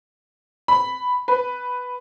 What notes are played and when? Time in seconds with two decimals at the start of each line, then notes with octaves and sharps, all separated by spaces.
0.68 B5
1.28 B4